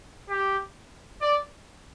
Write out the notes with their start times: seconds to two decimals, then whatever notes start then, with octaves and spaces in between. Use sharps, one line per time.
0.29 G4
1.21 D5